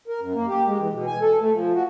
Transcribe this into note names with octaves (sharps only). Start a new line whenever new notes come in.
A#4
F#2
A#3
G4
G#3
E3
B2
G#5
A4
A3
F3
F#4